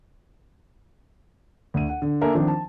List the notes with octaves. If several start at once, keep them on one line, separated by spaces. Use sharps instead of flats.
D2 D#7
F#5
D3
A#3 D4 A4 A#4 E5 G#5
D#3 F3 C4 D4
A5